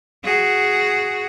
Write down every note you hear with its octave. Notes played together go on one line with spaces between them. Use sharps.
F#4 G#4